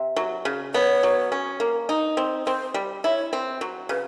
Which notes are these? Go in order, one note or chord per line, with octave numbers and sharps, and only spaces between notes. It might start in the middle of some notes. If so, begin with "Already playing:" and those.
Already playing: C3
F#3
C#3
B3 C#5
F#3
C#4
A#3
D#4
C4
C4 C5
G3
E4 C#5
C4
F#3
C#3 B4